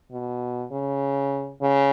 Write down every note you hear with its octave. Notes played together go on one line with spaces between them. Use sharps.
B2
C#3
C#3